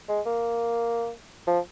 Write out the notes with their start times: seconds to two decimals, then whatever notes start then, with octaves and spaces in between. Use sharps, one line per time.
0.09 G#3
0.26 A#3
1.47 F3